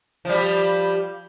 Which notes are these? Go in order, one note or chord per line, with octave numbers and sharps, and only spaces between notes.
F3 G3